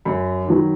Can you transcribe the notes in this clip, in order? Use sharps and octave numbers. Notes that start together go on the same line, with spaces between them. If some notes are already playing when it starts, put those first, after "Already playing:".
F#2 B5
D#3 F#3